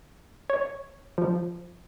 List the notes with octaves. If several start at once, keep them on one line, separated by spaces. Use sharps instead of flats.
C#5
F3